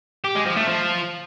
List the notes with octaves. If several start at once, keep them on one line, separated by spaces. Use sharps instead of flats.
G4
G#3
F3
A3
F3